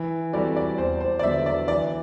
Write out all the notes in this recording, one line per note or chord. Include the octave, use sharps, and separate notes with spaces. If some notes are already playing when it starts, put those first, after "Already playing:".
Already playing: E3
G3 C4 F#4 A4 D5
D5
E2 C5
C5
D5
D3 F#3 B3 E4 E5
D5
E3 D5